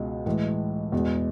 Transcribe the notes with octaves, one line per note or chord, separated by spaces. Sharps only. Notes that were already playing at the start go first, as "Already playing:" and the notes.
Already playing: C#2 B2 G#3
A2 E3 G#3
E2 B2 G#3